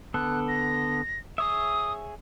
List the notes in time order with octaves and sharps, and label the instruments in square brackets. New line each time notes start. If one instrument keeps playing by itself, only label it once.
[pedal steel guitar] D3 B3 A4 [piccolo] F#6
[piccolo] A#6
[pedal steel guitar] G#4 C#5 E5 [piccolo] D#6